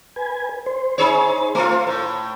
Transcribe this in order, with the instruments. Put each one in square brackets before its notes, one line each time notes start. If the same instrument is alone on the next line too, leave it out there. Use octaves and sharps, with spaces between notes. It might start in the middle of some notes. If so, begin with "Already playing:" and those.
[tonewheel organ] B4 G#5
C5
[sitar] D#4 G#4 C#5
A3 F4
A2